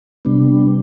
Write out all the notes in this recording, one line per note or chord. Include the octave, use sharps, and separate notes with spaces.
C3 G3 B3 D4